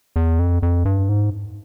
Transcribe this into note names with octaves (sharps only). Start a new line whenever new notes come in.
E2
F2
F2
G2
G#2